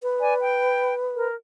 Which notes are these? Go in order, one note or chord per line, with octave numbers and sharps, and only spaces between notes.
B4
D5 G#5
G5
A#4